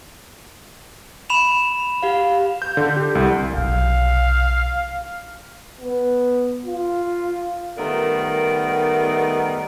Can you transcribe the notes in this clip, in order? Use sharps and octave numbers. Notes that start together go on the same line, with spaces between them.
B5 E7 F7
G4 F5
G6
D3
G4
C2
B1 C3 F5
B3
F4
D#3 G3 A3 B3 A#4 D5